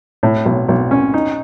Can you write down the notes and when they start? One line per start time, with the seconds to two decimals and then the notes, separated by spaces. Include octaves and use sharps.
0.23 A2
0.45 B1
0.68 B1
0.91 C#4
1.14 D#4